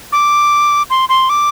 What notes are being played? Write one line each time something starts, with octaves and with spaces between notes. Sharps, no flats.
D6
C6
C6
D6